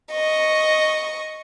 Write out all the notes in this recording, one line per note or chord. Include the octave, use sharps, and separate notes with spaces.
D#5 C#6